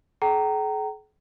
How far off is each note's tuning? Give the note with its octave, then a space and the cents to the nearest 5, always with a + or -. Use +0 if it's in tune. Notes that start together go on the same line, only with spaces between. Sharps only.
G#4 +45 G5 -40 A#5 -15